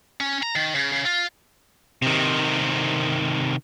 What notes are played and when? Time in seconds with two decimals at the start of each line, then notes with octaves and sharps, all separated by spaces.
0.21 C#4
0.43 A#5
0.56 D#3
0.75 C#3
0.92 C#3
1.06 F4
2.02 C3 D#3